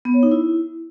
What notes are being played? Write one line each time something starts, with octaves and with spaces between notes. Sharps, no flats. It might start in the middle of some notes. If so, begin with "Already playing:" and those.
B3
C#5
D#4
E4